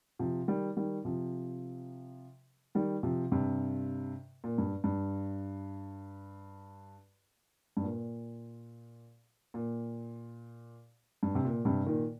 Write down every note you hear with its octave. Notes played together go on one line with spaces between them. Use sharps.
C3 F3
D#3 G3
D#3 G3
C3 F3
D#3 G3
C3 F3
G2 C3
A#2
G2
G2
G2
A#2
A#2
G2
C3
A#2
G2 C3
A#2 D#3